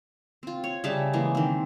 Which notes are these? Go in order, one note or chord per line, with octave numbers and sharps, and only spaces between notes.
C4 F4
C#5
C#3 G3 E5 A5
E3 G#3 A#3
D#3 C4